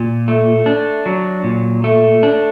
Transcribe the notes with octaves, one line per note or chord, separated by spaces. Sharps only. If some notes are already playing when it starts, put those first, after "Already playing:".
Already playing: A#2
A3
D4
F#3
A#2
A3
D4